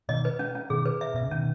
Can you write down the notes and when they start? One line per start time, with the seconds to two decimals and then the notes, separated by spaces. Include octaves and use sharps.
0.09 B2 D#3 D#5
0.25 B4
0.39 C#4
0.55 C#4
0.70 B2 D#3 G#4
0.86 B4
1.01 E5
1.14 B2 E5
1.23 C#3
1.31 B2 D#3 C#4